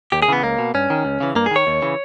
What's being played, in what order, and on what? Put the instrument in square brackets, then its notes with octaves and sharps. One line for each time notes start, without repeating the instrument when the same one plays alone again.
[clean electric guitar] D#2 G4
G#4
C#3 E3 B3
C#2 A#3
B2
G2 C#4
D#3
C#2
C#3 E3
G2 A#3
G#4
D#3 C#5
D#2
C#3 E3